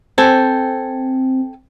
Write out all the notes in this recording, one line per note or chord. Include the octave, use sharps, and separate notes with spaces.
C4 A4 G5 G#5